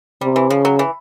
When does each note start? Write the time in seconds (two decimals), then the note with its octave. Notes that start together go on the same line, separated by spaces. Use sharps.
0.21 C3 G3
0.36 E3
0.50 C#3 F3
0.65 F#3
0.79 E3